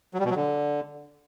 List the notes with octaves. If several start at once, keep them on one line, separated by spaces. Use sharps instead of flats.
F#3
G3
B2
F#3
D3